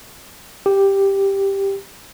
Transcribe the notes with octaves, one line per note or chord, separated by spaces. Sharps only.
G4